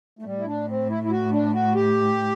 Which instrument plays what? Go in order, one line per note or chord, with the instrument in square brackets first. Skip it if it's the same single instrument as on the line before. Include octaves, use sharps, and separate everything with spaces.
[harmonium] A3
[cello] A2 [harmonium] G3
[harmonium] E4
D4
C4
E4
E4
F#4
D4
F#4
G4